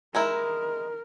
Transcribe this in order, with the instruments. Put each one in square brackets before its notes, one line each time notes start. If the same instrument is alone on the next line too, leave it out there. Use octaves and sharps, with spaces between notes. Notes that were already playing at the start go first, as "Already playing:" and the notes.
[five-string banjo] G#3 D#4 E4 [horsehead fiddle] A#4